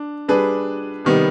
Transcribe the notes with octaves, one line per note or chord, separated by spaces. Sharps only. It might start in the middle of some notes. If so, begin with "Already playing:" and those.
Already playing: D4
G3 D4 G#4 B4
C3 D#3 G3 B3